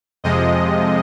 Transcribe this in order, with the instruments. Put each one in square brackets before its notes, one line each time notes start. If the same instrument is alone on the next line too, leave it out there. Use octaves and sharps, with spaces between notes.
[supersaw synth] F2 C3 F3 G#3 D#5